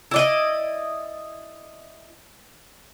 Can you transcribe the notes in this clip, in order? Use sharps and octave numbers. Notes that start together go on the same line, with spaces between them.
E4 D5 D#5